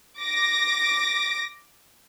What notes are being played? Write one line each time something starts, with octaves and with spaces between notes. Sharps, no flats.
D6 A#6